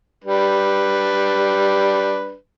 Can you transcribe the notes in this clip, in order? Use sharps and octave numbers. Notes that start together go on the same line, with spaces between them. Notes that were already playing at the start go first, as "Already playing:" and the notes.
G3 D4 B4